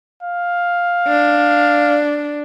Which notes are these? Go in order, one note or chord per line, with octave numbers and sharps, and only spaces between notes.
F5
D4